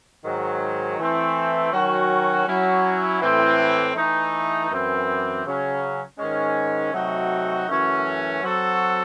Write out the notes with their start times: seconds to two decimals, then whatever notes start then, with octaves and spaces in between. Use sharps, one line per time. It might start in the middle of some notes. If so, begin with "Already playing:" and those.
0.24 G#2 D#3 F#3
0.98 E3 A3 C4
1.72 D#3 F#3 C#4 F#4
2.47 F#3 C#4 E4
3.21 A2 E3 C4
3.95 E3 A3 D#4
4.70 F#2 E3 C4
5.44 C#3 F#3 C#4
6.18 G#2 D#3 G#3 C#4
6.93 C3 F#3 A3 D#4 F#4
7.67 F#2 E3 A3 C#4 F#4
8.41 F#3 C4 F#4 A4